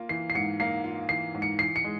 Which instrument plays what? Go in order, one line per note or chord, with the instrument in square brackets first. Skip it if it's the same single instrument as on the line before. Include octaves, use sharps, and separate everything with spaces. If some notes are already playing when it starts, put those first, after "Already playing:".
Already playing: [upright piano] A#3 F4
[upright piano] E3 [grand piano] C7
[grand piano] C7
[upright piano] G#2 [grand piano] C#7
[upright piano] A#3 [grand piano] C7
[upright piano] F4
[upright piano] E3 [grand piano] C7
[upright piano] G#2
[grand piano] C#7
[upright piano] E3 [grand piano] C7
[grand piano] C#7
[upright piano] G#3